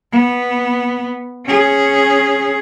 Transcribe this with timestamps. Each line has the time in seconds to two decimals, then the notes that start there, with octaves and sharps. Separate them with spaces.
0.12 B3
1.46 C#4 G#4